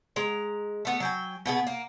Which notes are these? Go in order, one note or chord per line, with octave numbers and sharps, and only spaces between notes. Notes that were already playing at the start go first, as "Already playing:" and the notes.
G#3 A#5
A3 B3
F#3 G5 G#5
B2 B3 G#4
A#3